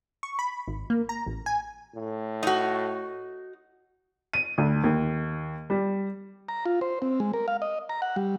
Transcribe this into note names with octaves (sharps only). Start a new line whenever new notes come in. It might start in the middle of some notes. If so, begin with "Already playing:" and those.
C#6
B5
G#1
A#3
A#5
A1
G#5
A2
D#4 F#4
D#7
D2
D#2
G3
A#5
F4
C5
C4
G#3
A#4
F5
D#5
A#5
F#5
G3